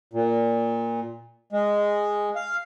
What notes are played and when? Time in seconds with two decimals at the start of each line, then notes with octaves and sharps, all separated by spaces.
0.13 A#2
1.52 G#3
2.36 F5